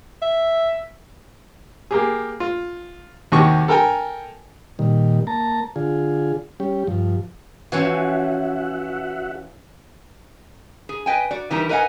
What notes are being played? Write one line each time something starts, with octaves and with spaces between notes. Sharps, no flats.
E5
A#3 G4 G#4
F4
D#2 C3 D#3 F#4 G5 C#6
A4 A#4 G5 G#5 A#5
A#2 D#3 G3
A#3 A5 A#5
D3 F4 G#4
G3 C#4 G4
G2 F3
E3 F3 C#4 F#4 E5 F#5
G#4
B4 D#5 G5 G#5
F#4 D5
E3 G3 D#4 E4 A#4
A#4 B4 D#5 F5 F#5 G#5